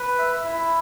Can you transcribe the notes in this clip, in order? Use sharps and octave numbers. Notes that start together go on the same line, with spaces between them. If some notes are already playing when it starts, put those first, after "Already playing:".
Already playing: B4
E5
E4